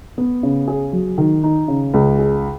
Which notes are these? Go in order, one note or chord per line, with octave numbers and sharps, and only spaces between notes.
B3
C#3
G#4
F#3
D#3
D#4
C#3
C#2
G#4